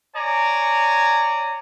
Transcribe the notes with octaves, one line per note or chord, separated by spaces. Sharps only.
C#5 D5 G#5 A#5